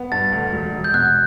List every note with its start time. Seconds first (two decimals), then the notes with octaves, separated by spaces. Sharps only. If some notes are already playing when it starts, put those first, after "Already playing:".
Already playing: B3
0.12 G2 A6
0.32 D2
0.53 E1
0.73 E1
0.84 G6
0.94 B2 F#6